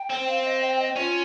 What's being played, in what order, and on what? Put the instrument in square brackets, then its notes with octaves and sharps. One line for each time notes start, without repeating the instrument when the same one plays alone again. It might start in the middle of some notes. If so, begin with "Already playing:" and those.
Already playing: [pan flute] G5
[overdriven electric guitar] C4
[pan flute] F5
D#5
G5
D#5
[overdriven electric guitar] C#4 [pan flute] F4